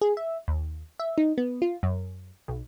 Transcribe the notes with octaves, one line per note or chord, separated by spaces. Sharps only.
G#4
E5
D#2
E5
D#4
B3
F4
F#2
B1